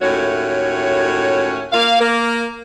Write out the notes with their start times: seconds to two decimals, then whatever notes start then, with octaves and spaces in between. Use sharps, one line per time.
0.02 D#2 A2 A3 C#4 F#4 C#5
1.73 A#3 F5
2.00 A#3 A#4